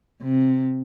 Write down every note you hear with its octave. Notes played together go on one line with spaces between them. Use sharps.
C3